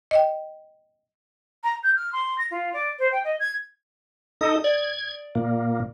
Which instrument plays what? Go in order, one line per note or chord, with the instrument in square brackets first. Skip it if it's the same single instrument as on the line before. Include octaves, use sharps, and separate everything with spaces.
[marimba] D#5 G5
[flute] A#5
G6
F6
C6
A#6
F4
D5
C5
G5
D#5
G#6
[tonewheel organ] D#4 A4 D#5 [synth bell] D#6
[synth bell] D5 [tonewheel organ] G#6
[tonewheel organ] A#2 A#3